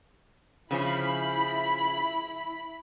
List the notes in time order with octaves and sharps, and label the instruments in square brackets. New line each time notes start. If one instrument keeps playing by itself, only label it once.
[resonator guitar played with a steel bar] C#3 F3 C#4 [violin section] E4 B5